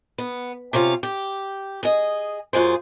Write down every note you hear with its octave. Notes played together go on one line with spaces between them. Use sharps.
B3
C3 C#4 F4 F5
G4
G#4 D#5
F#2 F4 G#4 C5